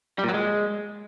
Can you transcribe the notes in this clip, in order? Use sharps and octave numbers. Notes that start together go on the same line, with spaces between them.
G3
A#2
F#3
G#3